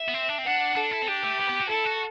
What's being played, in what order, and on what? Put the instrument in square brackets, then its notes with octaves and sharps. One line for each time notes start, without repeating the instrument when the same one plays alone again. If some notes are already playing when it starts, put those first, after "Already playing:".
Already playing: [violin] E5
[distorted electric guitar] B3
C4
D4
C4
[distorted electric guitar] D4 [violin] F#5
[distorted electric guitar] D4 [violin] A4
[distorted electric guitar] E4
C4
[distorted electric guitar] D4 [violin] G4
[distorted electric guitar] A3
B3
B3
F#4
[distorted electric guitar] E4 [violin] A4
[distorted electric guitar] F#4